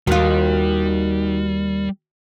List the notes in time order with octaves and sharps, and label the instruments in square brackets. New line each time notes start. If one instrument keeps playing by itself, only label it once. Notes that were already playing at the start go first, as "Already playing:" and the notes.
[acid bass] D#2 [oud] D#3 F4 [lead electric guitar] G3 [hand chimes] F#4 F#6